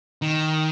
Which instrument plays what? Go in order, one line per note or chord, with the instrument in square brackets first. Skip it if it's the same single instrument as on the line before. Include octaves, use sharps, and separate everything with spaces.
[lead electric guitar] D#3